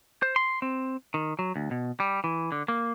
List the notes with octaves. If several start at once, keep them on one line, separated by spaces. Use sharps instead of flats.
C5
C6
C4
D#3
F#3
D2
B2
G3
E3
D3
A#3